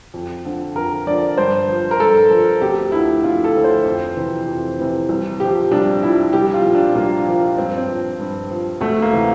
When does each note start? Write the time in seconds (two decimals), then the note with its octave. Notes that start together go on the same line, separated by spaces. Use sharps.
0.14 F2
0.45 D3 F3
0.75 F2 A#4
1.06 D3 F3 D5
1.37 G2 C5
1.69 F3
1.91 A#4
1.99 G2 A4
2.31 F3
2.61 D2 G4
2.92 D3 F3 E4
3.24 D2 F4
3.44 A4
3.55 D3 F3
3.64 C5
3.85 F2
4.16 C3 E3
4.48 F2
4.79 C3 E3
5.09 C2
5.40 A#2 F3 G4
5.71 C2 D4
6.03 A#2 F3 E4
6.33 C2 G4
6.54 F4
6.64 A#2 F3
6.75 D4
6.95 C2 A#3
7.27 A#2 F3
7.58 G2 C4
7.78 C4
7.88 F3
8.19 G2
8.50 F3
8.81 D2 A3
9.02 A#3
9.13 C3 E3